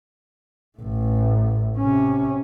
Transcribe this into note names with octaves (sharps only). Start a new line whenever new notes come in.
A1 A2
C3 C#4